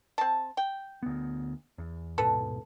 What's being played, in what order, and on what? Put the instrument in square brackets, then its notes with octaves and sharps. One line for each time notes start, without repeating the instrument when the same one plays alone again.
[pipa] C4 A5
G5
[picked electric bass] D2 B3
E2
[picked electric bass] D#1 G#2 B2 [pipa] A4 B4